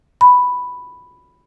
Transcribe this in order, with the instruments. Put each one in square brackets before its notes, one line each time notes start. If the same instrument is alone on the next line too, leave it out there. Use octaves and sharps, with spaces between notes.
[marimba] B5